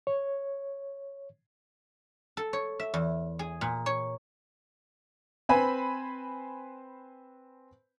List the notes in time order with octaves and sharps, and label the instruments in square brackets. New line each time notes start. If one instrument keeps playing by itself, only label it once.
[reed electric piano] C#5
[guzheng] A4
C#5
E5
E2
G#4
A#2
C#5
[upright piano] C4 B4 C5 G#5 B5